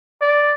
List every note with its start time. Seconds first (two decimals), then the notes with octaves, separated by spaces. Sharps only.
0.22 D5